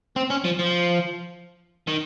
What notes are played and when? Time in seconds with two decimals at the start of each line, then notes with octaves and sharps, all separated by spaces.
0.16 C4
0.30 C#4
0.44 F3
0.59 F3
1.88 D#3